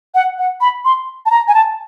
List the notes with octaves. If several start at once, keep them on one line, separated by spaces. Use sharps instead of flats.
F#5
F#5
B5
C6
A5
A#5
G#5
A5